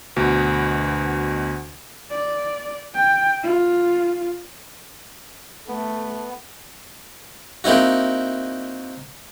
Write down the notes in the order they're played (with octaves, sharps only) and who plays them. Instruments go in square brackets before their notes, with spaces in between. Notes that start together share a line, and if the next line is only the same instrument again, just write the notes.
[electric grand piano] D2 B2 F#4
[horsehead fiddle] D5
G5
F4
[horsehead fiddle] A3 [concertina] B3
[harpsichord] A#3 C4 D#4 E4 F#4